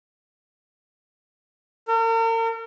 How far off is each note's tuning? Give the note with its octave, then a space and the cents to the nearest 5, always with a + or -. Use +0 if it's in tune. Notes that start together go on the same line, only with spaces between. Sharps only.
A#4 -40